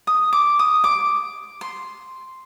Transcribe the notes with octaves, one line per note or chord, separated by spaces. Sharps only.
D#6
D6
D#6
D6
C6